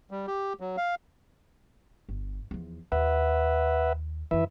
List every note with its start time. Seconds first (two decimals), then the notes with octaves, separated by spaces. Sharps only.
0.11 G3
0.27 G4
0.60 F#3
0.77 F5
2.09 G1
2.51 E2 F3
2.92 D#2 B4 E5 F#5
4.31 F#2 D#3 E3 B4 E5